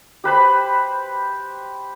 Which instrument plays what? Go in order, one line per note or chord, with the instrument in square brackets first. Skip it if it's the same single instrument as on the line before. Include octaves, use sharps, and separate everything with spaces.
[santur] G4 B4 C5 B5